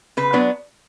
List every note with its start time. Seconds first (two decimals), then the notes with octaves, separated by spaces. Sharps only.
0.17 C#3 B4
0.33 F#3 B3 D4